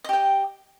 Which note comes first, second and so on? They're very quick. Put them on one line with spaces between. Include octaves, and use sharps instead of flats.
D#5 G4 G5